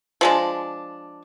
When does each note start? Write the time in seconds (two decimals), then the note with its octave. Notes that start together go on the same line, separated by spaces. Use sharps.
0.21 F3 G#3 D4